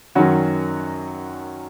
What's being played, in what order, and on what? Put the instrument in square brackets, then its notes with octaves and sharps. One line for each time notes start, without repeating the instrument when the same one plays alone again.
[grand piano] F#2 D#3 F#3 C#4 F#4